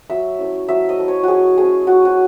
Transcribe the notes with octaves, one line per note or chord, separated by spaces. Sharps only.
F#3 E5
A3 C#4 E4
F#3 E5
D#5
A3 C#4 E4
C#5
F#3 F#4 G#4
A3 C#4 G#4
F#3 F#4
F#4